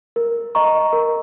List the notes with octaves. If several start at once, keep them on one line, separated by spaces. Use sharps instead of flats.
A#4
D#5 A#5 C#6
A#4